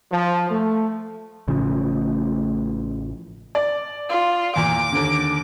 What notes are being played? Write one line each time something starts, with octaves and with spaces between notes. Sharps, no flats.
F3
A3
A1 A2 C#3 F3
D5
F4
E2 A#2 D6
D#2 D3